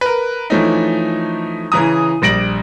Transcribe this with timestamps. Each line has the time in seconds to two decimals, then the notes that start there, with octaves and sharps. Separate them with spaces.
0.01 A#4 B4
0.50 E3 F3 A3 C#4 D#4
1.72 C#3 E3 A#5 D#6
2.22 A#1 G3 A#6 D7 F#7